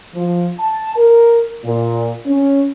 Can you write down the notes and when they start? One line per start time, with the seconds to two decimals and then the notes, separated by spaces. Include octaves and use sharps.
0.15 F3
0.60 A5
0.97 A#4
1.64 A#2
2.26 C#4